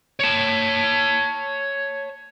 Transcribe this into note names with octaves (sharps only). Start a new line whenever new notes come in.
C#5 A5